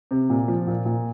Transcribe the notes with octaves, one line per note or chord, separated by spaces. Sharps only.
C3
A#2
F3
A#2
A#2